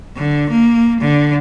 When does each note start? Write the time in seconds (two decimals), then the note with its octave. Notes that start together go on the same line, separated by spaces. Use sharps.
0.16 D3
0.50 A#3
1.00 D3